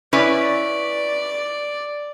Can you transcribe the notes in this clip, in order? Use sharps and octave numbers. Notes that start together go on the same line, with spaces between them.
C#4 E4 B4 D5